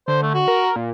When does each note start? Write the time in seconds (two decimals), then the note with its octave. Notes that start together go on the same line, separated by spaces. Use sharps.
0.08 D3 C5
0.22 A3
0.34 F#4
0.48 A#4
0.76 A#2